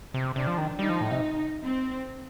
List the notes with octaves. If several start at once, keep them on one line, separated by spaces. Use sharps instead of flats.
C3
C3 D4
F3
D#3
G3 D#4
F3
A2
C3
C4